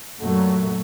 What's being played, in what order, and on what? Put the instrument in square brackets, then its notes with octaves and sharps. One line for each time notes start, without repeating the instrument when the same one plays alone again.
[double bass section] F#2 A#2 F#3 A3